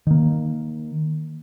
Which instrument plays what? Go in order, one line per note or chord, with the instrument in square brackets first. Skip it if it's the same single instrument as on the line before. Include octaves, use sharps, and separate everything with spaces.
[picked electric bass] D#3 A#3